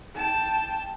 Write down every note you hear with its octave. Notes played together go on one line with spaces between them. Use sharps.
G5 A5